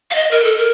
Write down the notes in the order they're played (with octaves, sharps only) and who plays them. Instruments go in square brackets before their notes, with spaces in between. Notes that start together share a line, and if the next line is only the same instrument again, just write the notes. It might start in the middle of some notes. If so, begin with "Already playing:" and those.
[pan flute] F5
D#5
A#4
A4
A#4